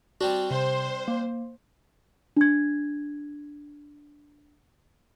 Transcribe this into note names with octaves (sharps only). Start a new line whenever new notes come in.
G3 C4 D4 F#4
C3 C5
A#3
D4 G#6